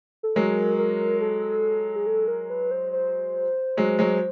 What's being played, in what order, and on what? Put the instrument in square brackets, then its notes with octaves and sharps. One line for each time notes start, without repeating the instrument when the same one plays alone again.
[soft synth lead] A4
[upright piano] F#3 G#3 [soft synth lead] A#4
[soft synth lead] A#4
A4
G#4
A4
A#4
B4
C5
C5
[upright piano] F#3 G#3
F#3 G#3